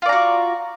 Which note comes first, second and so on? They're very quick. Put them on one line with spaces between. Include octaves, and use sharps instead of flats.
F4 D5 A#5 F#4